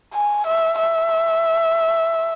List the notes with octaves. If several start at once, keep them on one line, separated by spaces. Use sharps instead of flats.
G#5
E5
E5